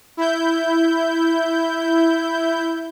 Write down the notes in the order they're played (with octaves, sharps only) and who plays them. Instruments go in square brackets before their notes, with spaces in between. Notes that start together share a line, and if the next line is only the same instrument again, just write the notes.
[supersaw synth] E4 G6